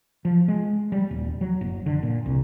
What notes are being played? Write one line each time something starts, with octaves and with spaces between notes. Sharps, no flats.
F3
G#3
G3
D#1
F#3
F#1
D3
A#2
C2